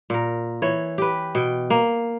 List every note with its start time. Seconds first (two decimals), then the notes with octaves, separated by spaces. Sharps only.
0.10 A#2 A#4
0.62 E3 C#5
0.98 G4 B4
1.35 B2 G5
1.70 A#3